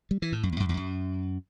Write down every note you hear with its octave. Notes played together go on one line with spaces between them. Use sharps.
G3
E3
A2
F#2
E2
F#2
E2
F#2